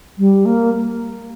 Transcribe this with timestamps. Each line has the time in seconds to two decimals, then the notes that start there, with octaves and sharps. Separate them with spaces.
0.18 G3
0.45 A#3